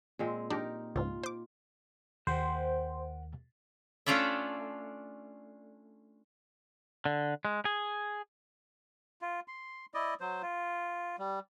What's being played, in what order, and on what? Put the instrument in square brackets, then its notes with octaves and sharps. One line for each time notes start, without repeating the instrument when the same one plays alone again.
[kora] A#2 G#3 C4
[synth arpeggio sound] D4 [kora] D#4 G4 A#4
[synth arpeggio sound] C#2 G#2 [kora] F4
[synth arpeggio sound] C5 D6
[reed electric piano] D#2 [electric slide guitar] A#4 F#5 G5 [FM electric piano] C5
[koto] A3 C#4 D4 F4 D5 E5
[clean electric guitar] D3
G#3
G#4
[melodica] F4
C6
E4 D5 D#5
F#3 C5
F4
G3